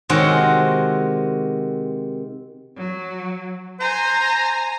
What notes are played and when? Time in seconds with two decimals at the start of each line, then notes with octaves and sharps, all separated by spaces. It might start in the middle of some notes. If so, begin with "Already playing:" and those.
0.09 C3 D#3 G#3 C4 F#4
2.77 F#3
3.80 C5 G#5 A#5